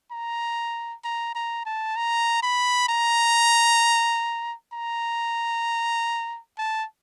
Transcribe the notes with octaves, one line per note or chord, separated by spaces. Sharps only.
A#5
A#5
A#5
A5
A#5
B5
A#5
A#5
A5